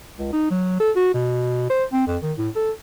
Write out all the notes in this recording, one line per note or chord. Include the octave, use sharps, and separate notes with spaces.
C#2
D#4
F#3
A4
F#4
B2
C5
C4
F2
D#3
A2
A4